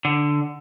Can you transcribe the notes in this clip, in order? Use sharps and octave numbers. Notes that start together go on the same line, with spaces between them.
D3